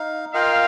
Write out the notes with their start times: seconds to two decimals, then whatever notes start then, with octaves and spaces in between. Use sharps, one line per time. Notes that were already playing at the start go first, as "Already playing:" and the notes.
Already playing: D#4 F5
0.33 F4 A#4 D#5 F5 G5